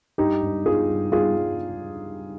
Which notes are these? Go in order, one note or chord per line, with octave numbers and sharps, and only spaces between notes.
G2 D#4 G4
G2
G2 F4 G#4
G2
G3 F4 G#4
G3